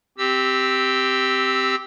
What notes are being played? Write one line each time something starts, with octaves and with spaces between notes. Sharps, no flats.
C4 G4 E6